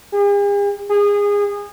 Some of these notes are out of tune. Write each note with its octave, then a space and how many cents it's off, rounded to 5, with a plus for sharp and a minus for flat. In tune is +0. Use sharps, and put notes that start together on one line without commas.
G#4 -45
G#4 -25